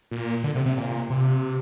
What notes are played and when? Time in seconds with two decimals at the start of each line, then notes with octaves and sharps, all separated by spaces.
0.11 A#2
0.44 D3
0.55 C3
0.66 C3
0.77 A#2
1.10 C3